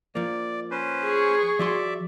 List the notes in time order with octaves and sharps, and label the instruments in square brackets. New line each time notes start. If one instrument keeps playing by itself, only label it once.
[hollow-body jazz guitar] F3 A#3 [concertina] D5
[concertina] C#4 B4 C5
[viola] G#4 C#6
[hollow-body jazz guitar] F3 F#4 C6 [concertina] D5 E5